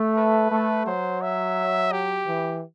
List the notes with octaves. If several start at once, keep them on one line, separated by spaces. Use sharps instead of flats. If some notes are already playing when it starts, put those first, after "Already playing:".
Already playing: A3
B4
A3
F#3 C5
E5
G4
E3